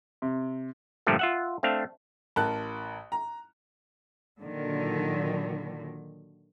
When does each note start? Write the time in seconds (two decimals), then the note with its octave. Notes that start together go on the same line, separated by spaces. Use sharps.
0.22 C3
1.07 G2 A#2 D3 F3 G3 A3
1.19 F4 E5 F#5
1.63 A3 C4 D4 F5
2.36 A1 A#4 A5 F#6
3.12 A#5
4.40 A#2 D3 D#3 F#3